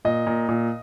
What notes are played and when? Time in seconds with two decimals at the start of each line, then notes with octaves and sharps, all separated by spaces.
0.05 A#2 D#5
0.27 A#2
0.49 A#2